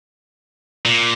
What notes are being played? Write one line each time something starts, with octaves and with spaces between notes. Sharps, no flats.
A#2